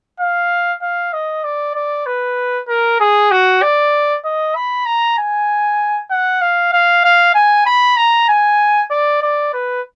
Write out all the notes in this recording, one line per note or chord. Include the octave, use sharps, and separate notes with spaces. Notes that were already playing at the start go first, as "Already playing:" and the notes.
F5
F5
D#5
D5
D5
B4
A#4
G#4
F#4
D5
D#5
B5
A#5
G#5
F#5
F5
F5
F5
G#5
B5
A#5
G#5
D5
D5
B4